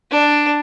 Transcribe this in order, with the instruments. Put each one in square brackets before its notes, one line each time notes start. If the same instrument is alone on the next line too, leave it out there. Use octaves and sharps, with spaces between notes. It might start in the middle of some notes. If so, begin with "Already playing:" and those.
[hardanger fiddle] D4